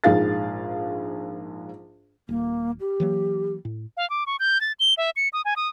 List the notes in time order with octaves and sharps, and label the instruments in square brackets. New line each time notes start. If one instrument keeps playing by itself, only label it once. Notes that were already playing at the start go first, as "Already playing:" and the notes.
[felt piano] A#1 G#2 G#4 F5 A6
[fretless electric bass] D#1 [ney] A#3
[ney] G4
[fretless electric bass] E3 F#3 A#3
A2
[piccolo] F5
D6
C#6
G6
A6
G7
E5
C#7
D#6
G#5
D#6